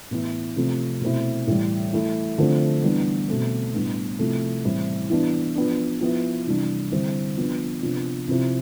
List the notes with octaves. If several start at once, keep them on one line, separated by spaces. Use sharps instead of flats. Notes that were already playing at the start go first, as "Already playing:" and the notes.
A2 E3 B3 E4
C3 F3 A3 C4
B2 A3 C4 E4
A2 E3 G3
E3 A3 E4
D3 F3 A3 C4
E3 G3 B3 D4
B2 A3 C4
A2 G3 B3 D4
C3 F3 A3 E4
A2 E3 G3 C4 E4
E3 B3 D4
F3 B3 D4
F3 B3 E4
C3 E3 G3 D4
D3 G3 C4 E4
F3 B3 D4
C3 F3 B3 D4
C3 F3 C4 E4